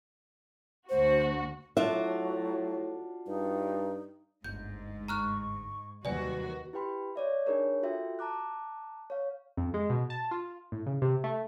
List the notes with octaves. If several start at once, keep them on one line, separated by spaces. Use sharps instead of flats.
D2 F#4 C5
A2 F#3 D4 F4 F#4 E5
G2 D#4
G1 D2 G#2 G6
A#5 C#6 F6 F#6
D#2 C3 F#3 G3 F#4 B4 D5 G#5
E4 G4 B4 G5 B5 C6
C#5 D5 E5
D4 D#4 G#4 A#4 C#5
F4 F#4 A4 E5 G5
A5 A#5 D6 F#6
C#5 F5
F2
G#3
B2
A5
F4
A2
C#3
C3
A3